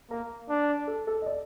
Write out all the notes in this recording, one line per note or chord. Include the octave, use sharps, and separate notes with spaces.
A#3 A#4
D4
A4
A4
D#5
D5